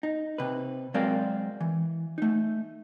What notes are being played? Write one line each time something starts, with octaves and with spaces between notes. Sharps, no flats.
D#4
C3 B4
F#3 G#3 C4 A#4 D5 F5
E3
A3 D#4